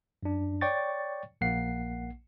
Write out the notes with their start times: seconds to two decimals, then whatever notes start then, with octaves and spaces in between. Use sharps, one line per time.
0.23 F#2 D4
0.61 C#5 D5 G5 C#6 A6
1.41 A#1 A#3 F#5 C7